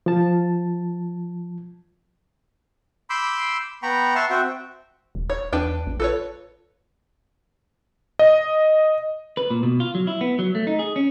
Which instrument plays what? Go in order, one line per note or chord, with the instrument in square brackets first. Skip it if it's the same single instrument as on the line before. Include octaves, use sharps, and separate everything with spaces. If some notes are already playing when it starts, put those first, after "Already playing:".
[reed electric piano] F3 A5
[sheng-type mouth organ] B5 C6 D6 E6 G6
B3 G5 A#5 B5 C#6
E5 F#5 A5 C6 C#6
C4 F#4 E5 G5
[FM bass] D#1
[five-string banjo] C#5
[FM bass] E2 [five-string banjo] D4 B4 G5
[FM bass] A1
[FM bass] F4 [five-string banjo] A4 B4 C#5
[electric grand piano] D#5
[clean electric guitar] B4
A#2
B2
F4
F#3
E4
B3
F#3
A3
D#4
G#4
C#4